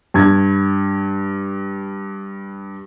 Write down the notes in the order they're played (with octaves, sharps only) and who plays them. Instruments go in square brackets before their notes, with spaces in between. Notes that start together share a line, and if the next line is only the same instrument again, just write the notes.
[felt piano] G2 G#6